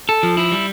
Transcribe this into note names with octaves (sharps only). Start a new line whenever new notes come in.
A4
F3
E4
G3